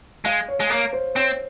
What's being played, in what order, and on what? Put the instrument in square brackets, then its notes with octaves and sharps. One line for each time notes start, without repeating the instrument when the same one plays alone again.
[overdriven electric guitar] G#3 [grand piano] F5
[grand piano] C#5
[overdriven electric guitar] G#3
[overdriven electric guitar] A#3 [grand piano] C#5
[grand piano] C5
[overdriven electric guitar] C4 [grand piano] C#5